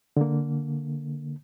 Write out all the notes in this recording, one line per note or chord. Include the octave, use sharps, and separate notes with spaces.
D3 A#3